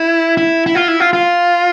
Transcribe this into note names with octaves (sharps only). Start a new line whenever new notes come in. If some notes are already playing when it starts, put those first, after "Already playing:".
Already playing: E4
E4
E4
F4
E4
F4
F4